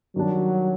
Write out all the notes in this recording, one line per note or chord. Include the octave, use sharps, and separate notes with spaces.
D#3 F#3 G3 D4